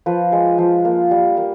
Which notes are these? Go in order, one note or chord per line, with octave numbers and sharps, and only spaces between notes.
F3 B4
G#3
F3
A#3
G3
A#3